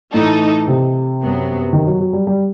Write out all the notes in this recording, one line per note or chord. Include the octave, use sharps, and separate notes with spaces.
A2 E3 A3 D#4 A4
C3
F#2 F#3 B3
D#3
F#3
F#3
G3
G3